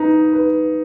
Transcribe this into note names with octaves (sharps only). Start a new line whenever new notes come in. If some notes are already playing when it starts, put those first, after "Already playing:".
Already playing: D#4 B4
B4